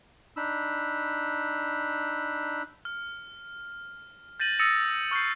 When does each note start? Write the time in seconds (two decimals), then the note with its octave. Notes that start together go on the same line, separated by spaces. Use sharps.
0.37 D4 D#4 B5 E6
2.85 F6
4.40 G6 A6 A#6 D#7 F#7
4.59 D#6 E6 A6 A#6 C#7 D#7
5.11 C#6 F6 G6 C7